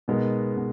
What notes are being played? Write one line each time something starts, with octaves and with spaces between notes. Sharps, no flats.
B2 G#3 B3 D#4 A#4
B2 B3